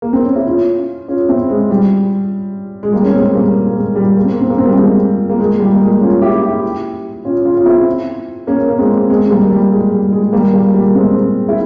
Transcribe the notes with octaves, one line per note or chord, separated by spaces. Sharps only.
A#3
C4
C#4
E4
C#4 F4
C#4 F4
C4 E4
G#3
G3
G#3
G3 A#3
C#4
G#3 C4
G3 A#3
A#3
G#3
G3
A#3
C4
A#3
C4
A#3
C4
G3 A#3
G#3 C4
A#3
G#3
G3
A#3
G#3
C#4 F4
E4 G4
E4 G4
C#4 F4
C#4 F4
F4
C4 E4
A#3 C#4
A#3
G#3 C4
G#3 C4
G3 A#3
G3
G#3
G3
G#3
G3 A#3
G3 A#3
G3 A#3
G#3 C4
E4